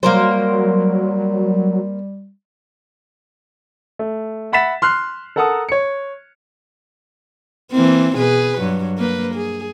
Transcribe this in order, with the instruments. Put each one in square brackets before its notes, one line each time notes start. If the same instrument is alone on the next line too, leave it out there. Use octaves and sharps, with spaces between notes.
[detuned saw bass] F#3 [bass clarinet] G3 [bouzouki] A#3 A#4 C5
[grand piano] A3
E5 F#5 B5 A6 B6 E7
C6 F6 F#6 C7
A4 A#4 F#5 A5 A#5 D#6
C#5 C#7
[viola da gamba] E3 A#3 C4
B2 G#4 B4
G2 F#3
A#3 B4
G#4